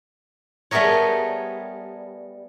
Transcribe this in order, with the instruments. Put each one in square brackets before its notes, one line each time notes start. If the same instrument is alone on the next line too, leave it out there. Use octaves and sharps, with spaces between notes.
[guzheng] G3 A3 B3 G#4 A#4 C#5